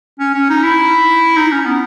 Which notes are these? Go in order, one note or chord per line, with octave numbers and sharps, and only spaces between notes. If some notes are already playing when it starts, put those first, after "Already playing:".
C#4
C#4
D#4
E4
D#4
C#4
B3